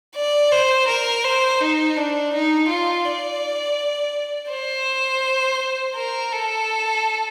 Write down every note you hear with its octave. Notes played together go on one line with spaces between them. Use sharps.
D5
C5
A#4
C5
D#4
D4
D#4
F4
D5
C5
A#4
A4